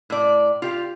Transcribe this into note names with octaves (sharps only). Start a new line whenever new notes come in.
A2 D5
F4 G4 F5